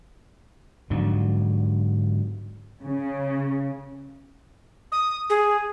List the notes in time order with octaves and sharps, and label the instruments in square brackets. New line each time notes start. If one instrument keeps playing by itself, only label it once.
[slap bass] G#2 D3 F3 F#3
[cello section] C#3
[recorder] D#6
G#4